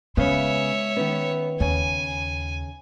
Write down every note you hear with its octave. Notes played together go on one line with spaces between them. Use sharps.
C#3 G#3 B3 C#5 E5
D#3 B3 C#4
D#2 C#3 G#5